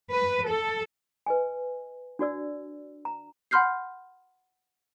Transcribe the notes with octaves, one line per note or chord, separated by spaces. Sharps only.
B4
A4
B4 D#5 G#5
D4 F#4 D5 E6
A#5
F#5 B5 C6 F6 G6 C7